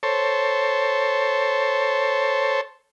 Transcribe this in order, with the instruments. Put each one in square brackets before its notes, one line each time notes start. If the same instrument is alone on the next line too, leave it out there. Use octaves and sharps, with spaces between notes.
[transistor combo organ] A4 C5 C#5